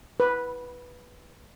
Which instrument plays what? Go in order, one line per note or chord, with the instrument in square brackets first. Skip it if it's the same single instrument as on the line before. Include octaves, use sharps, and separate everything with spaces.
[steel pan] B4